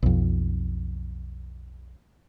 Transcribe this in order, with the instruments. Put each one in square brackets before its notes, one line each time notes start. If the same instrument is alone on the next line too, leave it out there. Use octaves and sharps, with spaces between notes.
[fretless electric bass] B1 F2